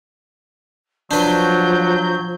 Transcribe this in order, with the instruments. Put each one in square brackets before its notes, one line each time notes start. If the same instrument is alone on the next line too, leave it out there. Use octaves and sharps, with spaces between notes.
[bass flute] F3 [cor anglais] F#3 [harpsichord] D4 B4 [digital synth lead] G6